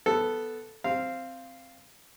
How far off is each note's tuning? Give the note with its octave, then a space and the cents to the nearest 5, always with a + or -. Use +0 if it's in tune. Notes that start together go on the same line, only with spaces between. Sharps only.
B3 +0 A4 +0
C4 +0 F5 -10